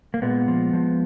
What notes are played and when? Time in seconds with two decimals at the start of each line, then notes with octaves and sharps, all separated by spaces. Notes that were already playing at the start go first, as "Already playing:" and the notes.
0.14 A#3
0.22 A#2 G#3 B3
0.48 F3
0.73 F3